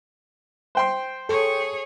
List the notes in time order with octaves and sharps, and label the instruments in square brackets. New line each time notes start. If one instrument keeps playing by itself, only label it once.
[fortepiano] C5 G5 C6
[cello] G#4 C#5 [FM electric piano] A4 C#6